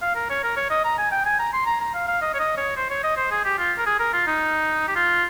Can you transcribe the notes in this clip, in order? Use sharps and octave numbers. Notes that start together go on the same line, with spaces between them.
F5
A#4
C#5
A#4
C#5
D#5
A#5
G#5
G5
G#5
A#5
C6
A#5
A#5
F5
F5
D#5
C#5
D#5
C#5
C5
C#5
D#5
C5
G#4
G4
F4
A#4
G#4
A#4
F4
D#4
G4
F4